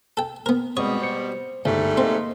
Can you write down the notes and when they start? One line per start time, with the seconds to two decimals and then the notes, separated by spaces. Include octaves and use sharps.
0.17 A4 G5
0.46 B3 A#4
0.77 B2 G3 G#3 C4 C#5 D#6
1.02 C5 C#7
1.65 G1 C#2 G#2 G3 A3
1.98 A#3 C4 D#5 C6